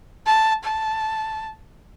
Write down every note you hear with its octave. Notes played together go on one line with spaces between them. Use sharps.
A5
A5